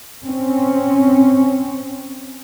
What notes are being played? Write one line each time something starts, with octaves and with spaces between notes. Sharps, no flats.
C4 C#4